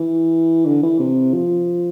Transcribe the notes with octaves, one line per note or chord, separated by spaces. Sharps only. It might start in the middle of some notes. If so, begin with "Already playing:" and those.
Already playing: E3
D3
E3
C3
F3